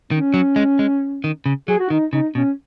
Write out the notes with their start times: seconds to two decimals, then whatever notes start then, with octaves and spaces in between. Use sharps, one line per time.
0.11 D#3 C#4
0.34 F#3
0.56 G#3
0.79 G#3
1.24 D#3
1.46 C#3
1.68 F#3 G#4
1.80 F#4
1.90 D#3 D#4
2.12 C#3 D#4
2.35 B2 C#4